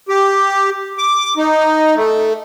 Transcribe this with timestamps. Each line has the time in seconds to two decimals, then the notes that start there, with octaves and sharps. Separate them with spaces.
0.09 G4
0.98 D6
1.37 D#4
1.96 A3